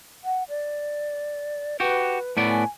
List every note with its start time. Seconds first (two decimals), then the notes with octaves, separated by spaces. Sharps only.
0.24 F#5
0.49 D5
1.80 F#4 G4 B4
2.37 A2 B3 D5
2.50 G#5